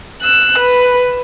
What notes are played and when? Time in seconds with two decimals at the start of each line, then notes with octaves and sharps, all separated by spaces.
0.22 E6 F#6
0.59 B4